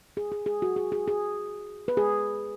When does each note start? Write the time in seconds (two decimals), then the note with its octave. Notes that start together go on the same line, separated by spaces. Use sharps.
0.17 G#4
0.32 G#4
0.46 G#4
0.62 F#4
0.76 G#4
0.92 G#4
1.08 G#4
1.88 B4
1.97 G#4